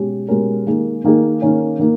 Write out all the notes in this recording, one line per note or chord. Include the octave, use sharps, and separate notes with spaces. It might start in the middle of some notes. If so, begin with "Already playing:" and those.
Already playing: B2 G#3 C#4 G4
B2 G#3 C#4 G4 A#4
D#3 A#3 D#4 G#4
D#3 A#3 D#4 G#4
D#3 A#3 C#4
D#3 A#3